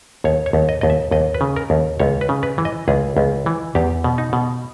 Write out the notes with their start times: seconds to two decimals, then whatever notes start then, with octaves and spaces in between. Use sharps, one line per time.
0.24 D#2 C#5
0.46 C#5
0.53 D#2
0.69 D#5
0.81 D#2 D#5
0.90 E5
1.11 D#2 D#5
1.34 B4
1.41 C#3
1.56 A#4
1.70 D#2
2.00 C#2 C#5
2.21 B4
2.29 C#3
2.43 B4
2.58 E3
2.65 D#5
2.88 C#2 G#4
3.17 C#2
3.46 E3
3.75 E2 G4
4.04 B2
4.18 D#4
4.33 B2